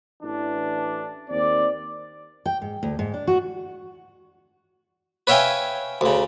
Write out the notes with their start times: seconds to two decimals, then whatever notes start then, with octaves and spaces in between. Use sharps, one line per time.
0.23 A1 E3 D4
1.29 D#2 C4 D5
2.46 G5
2.62 G#2
2.83 D2
2.99 G#2
3.14 D4
3.27 F#4
5.27 B4 C#5 E5 F5 G5 G#5
6.01 D2 C#3